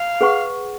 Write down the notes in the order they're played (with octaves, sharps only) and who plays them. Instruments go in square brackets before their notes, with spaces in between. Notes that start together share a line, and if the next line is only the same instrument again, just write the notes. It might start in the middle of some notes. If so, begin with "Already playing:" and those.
Already playing: [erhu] F5
[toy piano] G#4 B4 F#5 C#6